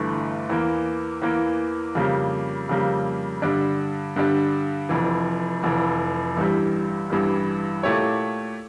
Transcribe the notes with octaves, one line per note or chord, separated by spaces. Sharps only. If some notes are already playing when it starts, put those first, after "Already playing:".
Already playing: G1 G2 E3 A3
E2 E3 A#3
E2 E3 A#3
F2 C#3 G3 A#3
F2 C#3 G3 A#3
G2 D3 G3 D4
G2 D3 G3 D4
F1 F2 E3
F1 F2 E3
A1 G2 E3 G3
A1 G2 E3 G3
A#2 A3 E4 G4 C#5